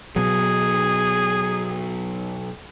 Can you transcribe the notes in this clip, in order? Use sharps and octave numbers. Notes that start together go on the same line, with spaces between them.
B2 F#3 G#4